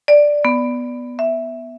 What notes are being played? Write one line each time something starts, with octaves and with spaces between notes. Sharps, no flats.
D5
B3
E5